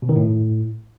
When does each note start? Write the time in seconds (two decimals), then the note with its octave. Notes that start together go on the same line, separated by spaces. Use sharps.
0.02 B2
0.09 D#3
0.16 A2